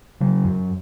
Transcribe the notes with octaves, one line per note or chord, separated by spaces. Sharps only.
C#3 F#3
F#2